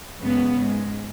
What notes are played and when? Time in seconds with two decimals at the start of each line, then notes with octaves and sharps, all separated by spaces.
0.20 F#2 C#3 G#3 B3
0.57 G#2 G#3